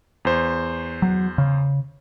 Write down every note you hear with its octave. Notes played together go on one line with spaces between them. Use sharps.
E2 C5
F#3
C#3